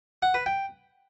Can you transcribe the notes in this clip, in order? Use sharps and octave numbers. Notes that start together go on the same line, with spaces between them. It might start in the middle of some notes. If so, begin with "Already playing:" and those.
F#5
B4
G5